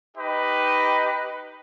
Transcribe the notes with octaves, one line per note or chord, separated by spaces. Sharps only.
D#4 G4 B4 D#5